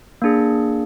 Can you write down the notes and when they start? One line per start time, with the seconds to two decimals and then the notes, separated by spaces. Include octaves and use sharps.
0.22 A#3 D4 G#4